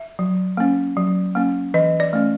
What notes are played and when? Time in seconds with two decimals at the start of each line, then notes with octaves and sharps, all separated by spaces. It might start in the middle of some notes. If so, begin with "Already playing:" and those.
Already playing: E5
0.19 F#3
0.57 A#3 C#4
0.97 F#3
1.35 A#3 C#4
1.74 E3 D#5
2.00 D5
2.13 A3 C#4